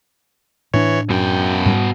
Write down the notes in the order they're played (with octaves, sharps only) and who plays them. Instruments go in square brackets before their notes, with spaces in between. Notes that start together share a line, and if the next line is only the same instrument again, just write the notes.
[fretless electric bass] A2 D4 [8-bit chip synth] E3 C#5
[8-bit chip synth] F#2 [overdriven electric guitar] B2 G5
[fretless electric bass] G#2 G3